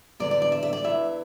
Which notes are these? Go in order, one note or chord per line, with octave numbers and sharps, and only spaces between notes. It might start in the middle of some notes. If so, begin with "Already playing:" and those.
E2 D3 D5
D5
D5
E5
E5
D5
E2 E3 E5